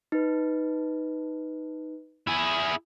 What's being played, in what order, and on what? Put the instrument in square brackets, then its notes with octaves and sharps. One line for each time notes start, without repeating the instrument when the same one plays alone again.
[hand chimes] D#4 B4
[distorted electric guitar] E4 G#4